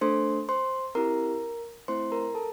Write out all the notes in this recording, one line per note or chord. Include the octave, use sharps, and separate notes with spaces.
A3 D4 A4 C5 C6
C5 C6
C4 E4 G4 A#4 A#5
A3 C4 E4 C5 C6
A#4 A#5
A4 A5